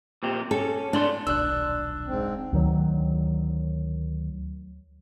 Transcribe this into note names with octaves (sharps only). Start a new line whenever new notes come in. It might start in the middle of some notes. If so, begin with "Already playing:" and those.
A#2 C4 G4
C#4 A4
A2 D4 D5 C6
D#1 B1 D4 E6 F#6
G#2 C4
D2 D#3 F#3